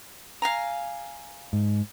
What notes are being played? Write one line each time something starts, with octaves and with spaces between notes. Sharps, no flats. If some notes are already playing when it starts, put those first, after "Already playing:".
F5 G#5 A#5
G#2